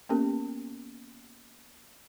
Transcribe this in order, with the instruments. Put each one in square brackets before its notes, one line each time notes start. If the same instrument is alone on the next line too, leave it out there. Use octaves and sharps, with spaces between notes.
[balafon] A#3 B3 C#4 G4 A4 A#4